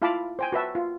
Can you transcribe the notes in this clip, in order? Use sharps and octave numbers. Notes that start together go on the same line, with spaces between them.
E4 F4 F5 A5 B5 D6
C5 G5 G#5
F#4 B4 E5 A5
F4